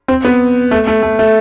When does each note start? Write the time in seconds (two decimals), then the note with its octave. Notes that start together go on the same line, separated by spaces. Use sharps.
0.08 C4
0.25 B3
0.71 A3
0.87 A3
1.03 A3
1.19 A3